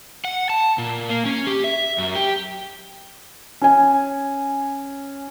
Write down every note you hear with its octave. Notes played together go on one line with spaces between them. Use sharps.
F#5
A5
A#2
A#3
C#4
G4
E5
F#2
G4
C#4 G#5